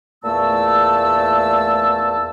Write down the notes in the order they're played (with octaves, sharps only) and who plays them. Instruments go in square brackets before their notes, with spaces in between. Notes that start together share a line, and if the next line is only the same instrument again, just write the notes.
[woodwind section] E2 A#2 A3 A5 E6